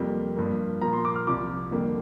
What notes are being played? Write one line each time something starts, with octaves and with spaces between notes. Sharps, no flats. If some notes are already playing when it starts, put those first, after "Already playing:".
Already playing: F2 C3 G3 A#3 G4
G2 F3 A#3
A#2 F3 A#3 A#5
C6
D6
F6
C2 C3 F3 D6
F2 D3 G3 A#3